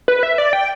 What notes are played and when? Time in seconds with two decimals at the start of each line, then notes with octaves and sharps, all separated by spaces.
0.08 B4
0.23 E5
0.38 D5
0.53 G5